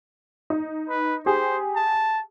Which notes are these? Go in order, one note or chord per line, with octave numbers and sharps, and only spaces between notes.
D#4
B4
G4 G#4 C5
A5